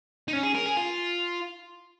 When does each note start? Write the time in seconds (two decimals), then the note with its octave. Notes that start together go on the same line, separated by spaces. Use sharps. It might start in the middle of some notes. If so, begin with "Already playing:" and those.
0.28 D#4
0.33 C#4
0.44 G#4
0.55 A#4
0.66 G#4
0.77 F4